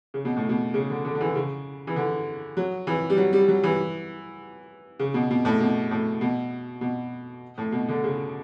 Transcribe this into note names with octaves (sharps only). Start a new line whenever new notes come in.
C#3
B2
A2
B2
C#3
D3
D3
D3
E3
C#3
E3
D3
F#3
E3
G3
F#3
G3
F#3
E3
C#3
B2
B2
A2
B2
A2
B2
B2
A2
B2
D3
C#3